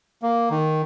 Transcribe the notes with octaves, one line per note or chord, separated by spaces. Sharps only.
A#3
D#3